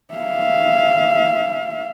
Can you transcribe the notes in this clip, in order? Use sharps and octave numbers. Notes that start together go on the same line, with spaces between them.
E5 F5